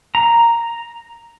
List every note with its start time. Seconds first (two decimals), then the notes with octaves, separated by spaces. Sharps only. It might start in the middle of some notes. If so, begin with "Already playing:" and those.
0.15 A#5